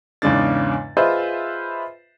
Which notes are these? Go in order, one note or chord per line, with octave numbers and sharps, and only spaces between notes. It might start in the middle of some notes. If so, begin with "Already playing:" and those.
E2 G#2 C#3 G#3 D4 A6
F4 G#4 B4 C5 D#5 E5